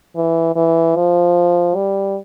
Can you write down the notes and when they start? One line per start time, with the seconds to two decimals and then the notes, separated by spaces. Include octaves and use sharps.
0.16 E3
0.56 E3
0.96 F3
1.76 G3